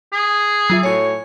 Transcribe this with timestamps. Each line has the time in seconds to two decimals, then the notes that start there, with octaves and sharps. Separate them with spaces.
0.13 G#4
0.70 F#3 F4 E5
0.83 A2 F#4 C#5 G#5 G#6